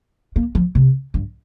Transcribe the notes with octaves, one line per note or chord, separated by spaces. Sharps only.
A#3
F3
C3
G2